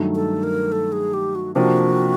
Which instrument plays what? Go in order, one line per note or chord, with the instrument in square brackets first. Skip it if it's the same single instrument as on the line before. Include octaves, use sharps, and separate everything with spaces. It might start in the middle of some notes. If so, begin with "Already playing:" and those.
Already playing: [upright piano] G2 D#3 F#3 A3
[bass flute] A4
A#4
A4
G#4
G4
F#4
[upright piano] C3 F3 A#3 D4 [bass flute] F#4